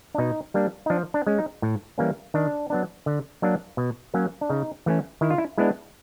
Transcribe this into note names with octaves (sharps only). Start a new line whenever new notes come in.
D4
B2 D#4
G3 A#3 D4
D#4
F3 D4
D4
G#3 C#4
D#4
A2
E3 G3 A#3 C#4
D#3 D4
F#3 B3 D4
D3
F#3 A#3 D4
B2
F#3 A#3 C#4
D4
C#3 D#4
E3 A3 C#4
D#3 E4
F4
E4
G#3 B3 D4 E4